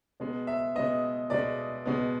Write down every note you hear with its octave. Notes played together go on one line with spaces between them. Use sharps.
B2 G#3 B3
E5
B2 G#3 B3 D#5
B2 G#3 B3 D5
B2 G#3 B3